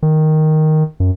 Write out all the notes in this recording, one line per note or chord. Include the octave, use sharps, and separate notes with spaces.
D#3
F#2